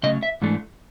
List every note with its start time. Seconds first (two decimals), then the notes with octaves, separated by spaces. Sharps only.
0.03 C#3 F#3 A3 C#4 D#5
0.23 E5
0.42 G#2 E3 A3 D4